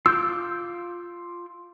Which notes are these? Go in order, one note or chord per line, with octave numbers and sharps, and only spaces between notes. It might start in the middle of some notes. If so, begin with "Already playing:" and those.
F4 D6 E6 G6